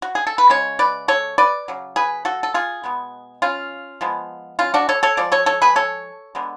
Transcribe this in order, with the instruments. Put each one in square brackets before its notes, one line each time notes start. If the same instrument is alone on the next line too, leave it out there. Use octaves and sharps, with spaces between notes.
[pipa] F#4
G#4
A4
B4
C#3 G#3 C#5
B4 D5
A4 C#5
B4 D5
C#3 F#3
G#4 B4
F#4 A4
A4
F4 G#4
B2 G#3 B3
C#4 F4
F3 G#3 B3
C#4 F4
D4 F#4
A4 C#5
A4 C#5
F3 G#3 D5
A4 C#5
A4 C#5
G#4 B4
A4 C#5
D3 G#3 B3